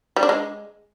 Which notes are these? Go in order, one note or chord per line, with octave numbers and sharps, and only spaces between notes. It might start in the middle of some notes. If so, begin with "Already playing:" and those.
G3
D4
G#3